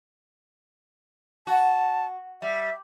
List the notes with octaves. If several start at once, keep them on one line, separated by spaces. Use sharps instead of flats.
F#4 A5
G3 E5